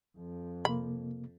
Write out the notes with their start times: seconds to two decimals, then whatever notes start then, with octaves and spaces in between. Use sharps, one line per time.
0.18 F2
0.65 C3 A#3 B5